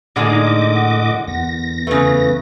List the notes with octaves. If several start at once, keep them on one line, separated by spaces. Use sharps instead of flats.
A2 D3 G#3 A#3 D#5 D6
D#4
F#5
E2 A#6
C#3 A3 B4